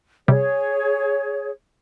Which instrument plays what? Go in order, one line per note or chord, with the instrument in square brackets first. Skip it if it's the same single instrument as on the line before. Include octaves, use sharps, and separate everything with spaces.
[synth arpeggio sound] C3 G3 [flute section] G#4 C#5